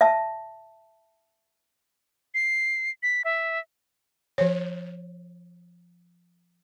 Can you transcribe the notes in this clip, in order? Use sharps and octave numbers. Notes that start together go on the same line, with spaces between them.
E5 A5
C7
B6
E5
F3 C#5